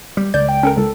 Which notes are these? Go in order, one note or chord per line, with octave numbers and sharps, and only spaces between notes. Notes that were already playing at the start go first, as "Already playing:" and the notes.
G3
C#2 D5 G6
G5
C#4 A4 A#4
C#2 A4